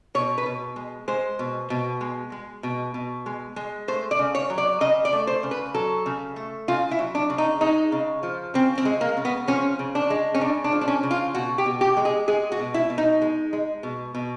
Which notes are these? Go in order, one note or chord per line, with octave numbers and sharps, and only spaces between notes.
B2 C#5
B4
B2
G#3
G#3 C5
B2
B2
G#3
G#3
B2
B2
G#3
G#3
A3 C5
D5
C#3
C#5
F#3
D5
C#3 D#5
D5
A3
C5
C#3
B4
F#3 A4
C#3
A3
C#3 F4
E4
F#3
D4
C#3
D#4
G#3 D#4
C#3
F3
C#3 C4
C4
G#3
A#3
C#3
B3
F3 C#4
C#3
D4
G#3
C#4
C#3 D4
D4
F3
D4
C#4
C#3
F4
B2 F#4
G4
B2
G4
G#3
G#4
G#3 G#4
F#4
B2
E4
B2
D#4
G#3
G#3
B2
B2